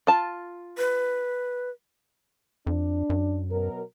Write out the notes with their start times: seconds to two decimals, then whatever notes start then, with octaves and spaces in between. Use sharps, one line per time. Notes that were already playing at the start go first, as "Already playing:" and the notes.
0.07 F4 A5
0.78 B4
2.67 F2 D4
3.10 F#2
3.50 B2 F#3 A#4